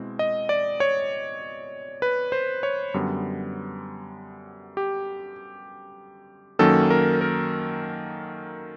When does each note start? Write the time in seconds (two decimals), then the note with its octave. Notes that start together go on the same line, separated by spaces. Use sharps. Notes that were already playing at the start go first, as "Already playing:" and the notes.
Already playing: B2 G#3 C4 E4
0.19 D#5
0.49 D5
0.80 C#5
2.02 B4
2.32 C5
2.63 C#5
2.94 F#2 D3 G3 B3
4.77 G4
6.59 F#2 D#3 F#3 A#3 C#4 A4
6.90 A#4
7.21 A#4